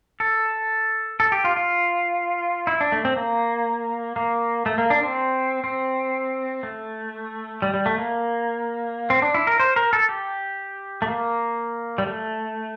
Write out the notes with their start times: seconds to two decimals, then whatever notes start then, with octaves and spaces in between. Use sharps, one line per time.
0.20 A4
1.20 A4
1.32 G4
1.44 F4
1.57 F4
2.67 E4
2.81 D4
2.92 A3
3.05 C4
3.16 A#3
4.16 A#3
4.66 A3
4.78 A#3
4.90 D4
5.03 C4
5.64 C4
6.63 A3
7.62 G3
7.74 G3
7.86 A3
7.98 A#3
9.10 C4
9.22 D4
9.34 E4
9.47 A#4
9.60 C5
9.76 A#4
9.93 A4
10.09 G4
11.02 A3
11.07 A#3
11.98 G3
12.06 A3